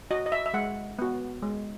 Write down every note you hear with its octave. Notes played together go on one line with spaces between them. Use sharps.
F#4 D#5
D#5
E5
E5
G#3 F#5
B3 F#4
G#3